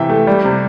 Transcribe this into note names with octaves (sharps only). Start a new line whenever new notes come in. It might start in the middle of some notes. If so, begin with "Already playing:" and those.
Already playing: C3 E3 E5 G5
A3
G3
C3